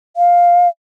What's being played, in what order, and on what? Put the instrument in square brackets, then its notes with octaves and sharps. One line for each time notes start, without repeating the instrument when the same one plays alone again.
[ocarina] F5